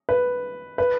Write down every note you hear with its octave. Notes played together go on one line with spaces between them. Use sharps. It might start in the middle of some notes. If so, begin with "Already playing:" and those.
B4
B4